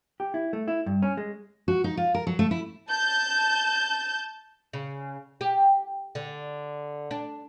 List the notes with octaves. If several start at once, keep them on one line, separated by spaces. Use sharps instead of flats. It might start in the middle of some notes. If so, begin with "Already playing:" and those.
G4
E4
A3
E4
G2
C#4
G#3
F#4
D#4
F4
A#4
F#3
A3
E4
A5 G6
C#3
G4
D3
D4